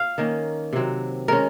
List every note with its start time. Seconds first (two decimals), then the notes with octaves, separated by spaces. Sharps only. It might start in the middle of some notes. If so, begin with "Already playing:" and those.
Already playing: F5
0.18 D#3 A#3 C#4
0.73 C3 F#3 C4
1.28 D#3 G#3 C#4 A#4